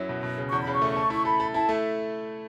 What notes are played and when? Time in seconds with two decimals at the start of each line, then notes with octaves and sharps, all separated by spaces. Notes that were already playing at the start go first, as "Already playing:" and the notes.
Already playing: F#2 F#3 E4
0.09 B2
0.23 B2
0.38 C#3
0.49 E2 C#6
0.61 B5
0.67 C#3
0.73 C#6
0.82 A3
0.96 A4
1.10 E4 C#6
1.25 A4 B5
1.40 A4
1.54 E4 A5
1.69 A3